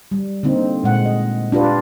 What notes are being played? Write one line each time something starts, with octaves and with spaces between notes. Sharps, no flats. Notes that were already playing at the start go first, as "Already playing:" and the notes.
G3
D3 A#3 C4 D#4
A#2 G#3 F#5
D#5
D4 F4 G4 B4